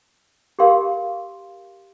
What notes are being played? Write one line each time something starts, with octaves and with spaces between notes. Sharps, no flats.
G4 A#4 F5 C6